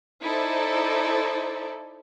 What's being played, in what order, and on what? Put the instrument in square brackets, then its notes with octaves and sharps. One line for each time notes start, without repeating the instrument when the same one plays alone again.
[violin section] D#4 E4 A4 C5 D5